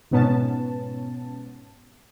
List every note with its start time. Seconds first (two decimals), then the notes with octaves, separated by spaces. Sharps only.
0.11 G#2 B2 B3 C#4 A5